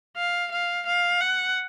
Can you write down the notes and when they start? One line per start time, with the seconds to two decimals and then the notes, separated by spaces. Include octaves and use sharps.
0.17 F5
0.51 F5
0.86 F5
1.21 F#5